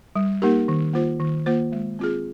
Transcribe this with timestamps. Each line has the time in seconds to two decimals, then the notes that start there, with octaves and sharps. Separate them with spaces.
0.16 G3
0.42 A#3 D#4 G4 A#4
0.68 D#3
0.94 A#3 F4 C5
1.20 D#3
1.46 A#3 F4 C5
1.72 G#3
1.99 C4 F4 G#4